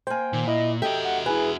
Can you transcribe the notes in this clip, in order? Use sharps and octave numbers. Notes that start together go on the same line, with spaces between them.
A#3 C5 G5 G#5
A#2 D#3
E4 D#5
F#4 G4 A4 D#5 E5 G5
F#5
E4 G#4 B4 G#5